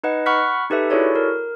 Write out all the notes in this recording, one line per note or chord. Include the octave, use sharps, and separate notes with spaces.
D#4 B4 D#5 F#5
F#5 B5 C#6 F6 F#6 B6
D#4 G4 A4 B4 E5
E4 F#4 G#4 A4 C#5 D5
A#4